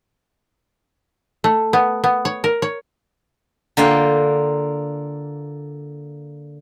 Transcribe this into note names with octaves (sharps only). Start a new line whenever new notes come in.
A3
B3
B3
C#5
A#4
C#5
D3 A#3 F4 G5